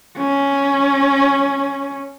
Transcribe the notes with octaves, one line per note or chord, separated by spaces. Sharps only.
C#4